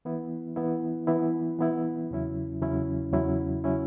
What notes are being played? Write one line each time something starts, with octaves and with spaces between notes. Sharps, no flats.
E3 B3 E4
E3 B3 E4
E3 B3 E4
E3 B3 E4
E2 C#3 F#3 C#4 E4
E2 C#3 F#3 C#4 E4
E2 C#3 F#3 C#4 E4
C#3 F#3 C#4 E4